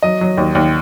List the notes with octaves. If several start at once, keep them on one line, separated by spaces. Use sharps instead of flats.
F#3 D#5
F#3
D#2
D#2